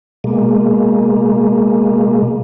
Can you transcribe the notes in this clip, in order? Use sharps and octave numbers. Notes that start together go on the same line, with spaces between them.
B2 G#3 A#3